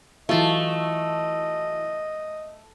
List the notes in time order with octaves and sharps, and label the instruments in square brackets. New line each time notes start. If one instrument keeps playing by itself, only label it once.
[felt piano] E3 F#3 E4 [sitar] A3 [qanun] F4 A5 [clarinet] D#5